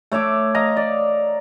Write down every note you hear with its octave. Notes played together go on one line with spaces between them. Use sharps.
A3 C#5 E5 D6
D#5 F5 A#5
D5